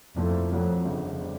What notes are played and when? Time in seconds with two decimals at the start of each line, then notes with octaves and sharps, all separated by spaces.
0.16 F2 A#2 F3 A3 C4 E4
0.51 F2 A#2 F#3 A3
0.85 G1 F2 C#3
1.19 D3 G3 C4